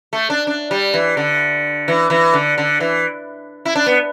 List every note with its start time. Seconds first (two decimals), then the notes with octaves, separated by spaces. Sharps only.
0.13 A3
0.30 D4
0.47 D4
0.71 G3
0.94 E3
1.17 D3
1.88 E3
2.10 E3
2.34 D3
2.58 D3
2.80 E3
3.65 E4
3.75 D4
3.86 B3